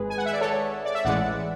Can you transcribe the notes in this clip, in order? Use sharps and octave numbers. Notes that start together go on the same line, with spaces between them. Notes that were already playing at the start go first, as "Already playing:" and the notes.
Already playing: G#1 G#2 G#3 G#4 B4
G#5
F#5
E5
D5
A4 C#5
D5
E5
A1 A2 E3 G#3 D5 F#5